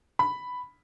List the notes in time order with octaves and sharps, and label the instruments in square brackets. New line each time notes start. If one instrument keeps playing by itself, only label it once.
[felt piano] B5